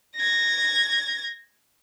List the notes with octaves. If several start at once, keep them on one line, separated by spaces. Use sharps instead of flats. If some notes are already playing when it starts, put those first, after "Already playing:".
G#6 A#6